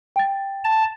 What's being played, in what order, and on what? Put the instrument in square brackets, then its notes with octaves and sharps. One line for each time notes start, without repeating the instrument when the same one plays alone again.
[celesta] G5 A6
[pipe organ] A5